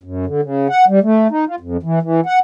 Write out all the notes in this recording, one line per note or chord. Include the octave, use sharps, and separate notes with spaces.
F#2
D3
C#3
F#5
G3
A3
D#4
F4
F2
E3
E3
F#5